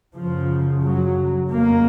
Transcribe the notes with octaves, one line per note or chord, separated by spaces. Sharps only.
F#2 C#3 F3
F#3
F2 C#3 A#3